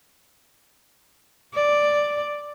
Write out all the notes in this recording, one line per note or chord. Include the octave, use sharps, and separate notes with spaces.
D5